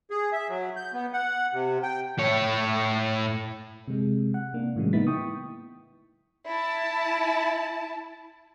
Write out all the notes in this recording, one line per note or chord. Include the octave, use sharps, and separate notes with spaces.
G#4
E5
F#3
G6
B3
F#5
C3
G5
A2 C#5
C3 G#3
F#5
C3 A#3 D4
A2 C#3 E3 F#3 G#3
A#3 B3 D#4 E4 A6 B6
G5 C#6 D#6
E4 A5